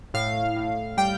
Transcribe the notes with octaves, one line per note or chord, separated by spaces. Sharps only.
A2 F5
A2
G3 G5